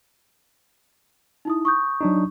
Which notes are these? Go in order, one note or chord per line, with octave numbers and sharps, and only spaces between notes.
D#4 E4 D#6
C#6 D#6 G6
F#3 D4 D#4